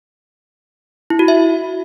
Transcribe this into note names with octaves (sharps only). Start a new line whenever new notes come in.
E4
F#4
E5